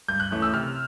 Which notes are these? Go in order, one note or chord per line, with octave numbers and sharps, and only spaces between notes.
G2 G6
F#6
E3 A3 C#4
E6
C3 F6